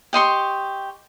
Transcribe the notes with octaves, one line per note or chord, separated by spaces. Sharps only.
G4 D#5 C6 C#6